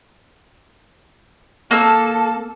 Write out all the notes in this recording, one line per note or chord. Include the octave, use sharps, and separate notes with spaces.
A#3 A4 A5 E6